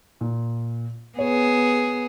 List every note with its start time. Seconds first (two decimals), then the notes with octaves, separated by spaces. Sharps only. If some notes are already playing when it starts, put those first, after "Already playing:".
0.21 A#2
1.19 B3 G#4 C#5